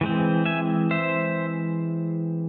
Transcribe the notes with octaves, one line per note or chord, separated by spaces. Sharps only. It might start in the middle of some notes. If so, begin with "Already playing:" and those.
E3 G#3 C4
E5 G#5
C5 E5